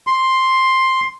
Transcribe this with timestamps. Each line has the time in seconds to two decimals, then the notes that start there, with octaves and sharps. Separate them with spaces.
0.07 C6